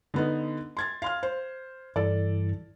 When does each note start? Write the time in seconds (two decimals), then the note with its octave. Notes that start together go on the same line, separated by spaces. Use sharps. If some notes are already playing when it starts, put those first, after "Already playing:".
0.14 D3 B3 D#4
0.77 C6 G#6 A6
1.02 F5 C6 F6
1.23 C5
1.96 G2 E3 A4 D5